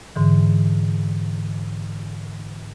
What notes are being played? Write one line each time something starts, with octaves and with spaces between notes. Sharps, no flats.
G#2 D3 E3